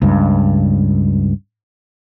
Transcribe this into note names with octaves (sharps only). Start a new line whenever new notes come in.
C#2 G2